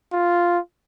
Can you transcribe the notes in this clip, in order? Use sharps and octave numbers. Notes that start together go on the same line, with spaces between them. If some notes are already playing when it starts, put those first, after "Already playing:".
F4